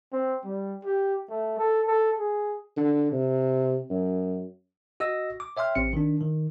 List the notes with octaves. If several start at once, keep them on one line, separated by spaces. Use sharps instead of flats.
C4
G3
G4
A3
A4
A4
G#4
D3
C3
F#2
F#4 D#5 E6 A#6
D6
C#5 E5 G5 C6 F6
A1 C4 C#7
D#3 D4
D#3